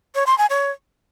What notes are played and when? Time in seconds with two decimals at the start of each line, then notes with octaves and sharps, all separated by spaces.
0.15 C#5
0.26 C6
0.38 G#5
0.50 C#5